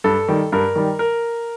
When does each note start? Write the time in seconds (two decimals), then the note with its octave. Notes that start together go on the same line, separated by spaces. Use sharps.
0.04 G2 A4
0.29 D#3 G3
0.52 G2 A#4
0.76 D#3 G3
0.99 A#4